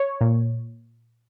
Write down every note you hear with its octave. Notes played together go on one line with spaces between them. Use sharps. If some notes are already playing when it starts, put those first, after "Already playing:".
Already playing: C#5
A#2